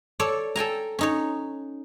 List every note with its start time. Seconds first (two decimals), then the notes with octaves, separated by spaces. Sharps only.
0.20 A4 C#5 D5
0.56 A4 G5 G#5 A#5
0.99 C#4 D#4 C#5